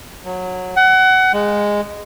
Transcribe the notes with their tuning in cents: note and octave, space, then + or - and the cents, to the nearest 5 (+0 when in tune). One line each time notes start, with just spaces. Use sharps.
F#3 -15
F#5 +25
G#3 -10